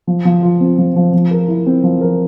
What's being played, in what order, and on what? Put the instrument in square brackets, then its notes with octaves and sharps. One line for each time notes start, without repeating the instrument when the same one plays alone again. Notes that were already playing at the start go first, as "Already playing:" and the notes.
[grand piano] F3
F3
F4
C4
F3
F3
F3
A#4
E4
C4
F3
A#4